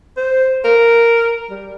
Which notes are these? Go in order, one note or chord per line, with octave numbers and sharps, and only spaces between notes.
C5
A#4
G3